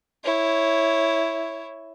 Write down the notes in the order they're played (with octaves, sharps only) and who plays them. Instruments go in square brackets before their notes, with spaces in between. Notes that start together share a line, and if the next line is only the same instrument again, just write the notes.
[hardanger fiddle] E4 C#5